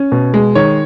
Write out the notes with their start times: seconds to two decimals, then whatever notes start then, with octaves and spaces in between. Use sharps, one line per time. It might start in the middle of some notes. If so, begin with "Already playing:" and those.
Already playing: C#4
0.12 B2
0.34 G#3
0.55 D#3 C#5